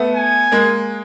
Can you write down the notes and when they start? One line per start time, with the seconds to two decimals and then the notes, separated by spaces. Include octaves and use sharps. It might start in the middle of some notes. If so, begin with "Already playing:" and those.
Already playing: A3 B3
0.16 G#5
0.51 G#3 A#3